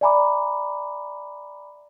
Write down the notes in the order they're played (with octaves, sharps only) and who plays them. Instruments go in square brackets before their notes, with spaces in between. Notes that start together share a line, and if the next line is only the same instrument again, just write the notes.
[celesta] D5 E5 G#5 A#5 B5 D6